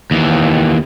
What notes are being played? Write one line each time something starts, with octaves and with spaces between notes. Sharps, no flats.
D#2 E3